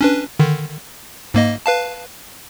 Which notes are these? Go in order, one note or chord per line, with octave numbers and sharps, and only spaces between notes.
C#4 D4 B4
D3 D#3
G#2 A#3 D#5
B4 F5 A5